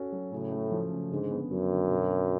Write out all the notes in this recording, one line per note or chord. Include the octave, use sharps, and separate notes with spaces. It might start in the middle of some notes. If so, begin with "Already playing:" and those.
Already playing: C#4 F#4 A4
F#3
A2 C#3
A3
F3
C#3
G#2 D3
B3
F#2 F#3
D3
B2
C#4